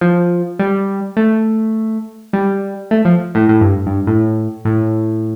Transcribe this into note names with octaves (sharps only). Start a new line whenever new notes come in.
F3
G3
A3
G3
A3
F3
A2
A2
G2
G2
A2
A2